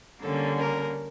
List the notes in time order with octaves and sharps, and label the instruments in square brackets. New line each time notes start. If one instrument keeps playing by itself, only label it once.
[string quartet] D3 G3 A#3 C#4 [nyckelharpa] A4
[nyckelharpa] A#4